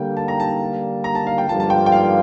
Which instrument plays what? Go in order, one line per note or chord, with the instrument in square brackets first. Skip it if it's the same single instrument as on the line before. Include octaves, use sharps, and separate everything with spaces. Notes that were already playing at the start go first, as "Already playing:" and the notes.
Already playing: [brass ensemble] D3 G3 A#3 [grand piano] G5
[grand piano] A5
A#5
A5
A#5
A5
F5
G5
[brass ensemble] G2 D3 F3 A#3 F4 [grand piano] A5
[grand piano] A5
G5
G5
F5